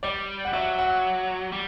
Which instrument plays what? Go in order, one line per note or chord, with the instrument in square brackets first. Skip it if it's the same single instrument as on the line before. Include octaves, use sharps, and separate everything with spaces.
[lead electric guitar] G3 [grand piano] D5
[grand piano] F#5
[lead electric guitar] F#3 [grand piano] E5
[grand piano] F#5
[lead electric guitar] G3